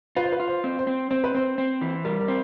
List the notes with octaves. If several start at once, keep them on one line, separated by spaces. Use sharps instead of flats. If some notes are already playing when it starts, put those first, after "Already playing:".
F4 B4
C5
B4
F4
C5
C4
C5
C4
C4 C5
B4
C4 C5
C4
E3
G3 A#4
A#4
C4